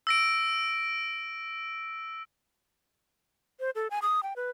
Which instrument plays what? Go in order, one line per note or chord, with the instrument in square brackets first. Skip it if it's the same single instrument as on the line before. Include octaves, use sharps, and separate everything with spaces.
[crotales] E6 A#6 D7
[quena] C5
A4
G#5
D#6
G5
B4